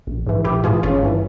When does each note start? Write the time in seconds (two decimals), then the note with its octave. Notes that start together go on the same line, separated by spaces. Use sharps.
0.07 A#1
0.26 G#2 E3
0.44 A#1 E4 G4
0.64 G#2 E3 F4 G#4
0.83 G#1 C#4 F4
1.03 G2 E3